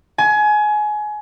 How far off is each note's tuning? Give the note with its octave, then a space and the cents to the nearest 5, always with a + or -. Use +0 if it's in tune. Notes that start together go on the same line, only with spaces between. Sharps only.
G#5 +25